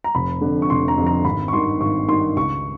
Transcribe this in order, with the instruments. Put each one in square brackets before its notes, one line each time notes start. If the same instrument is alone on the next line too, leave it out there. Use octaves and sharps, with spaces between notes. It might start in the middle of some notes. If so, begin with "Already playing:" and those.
[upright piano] A#5
F1 B5
F2 D3
C#6
F1 C6
A#5
F2 D3
A#5
G#1 B5
C#6
G2 D#3 C6
G#1 C#6
G2 D#3 C6
C#2 C#6